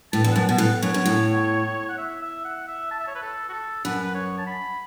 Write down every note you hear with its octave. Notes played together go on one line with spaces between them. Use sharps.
A2 A5
E2
F#5
F#2 A5
B2
A5
A2 F#5
F#2 C#5
F#2
A2
F#5
E5
E5
F#5
E5
A5
E5
C#5
B4
A4
F#4
A4
F#2 B4
B4
C#5
A5
B5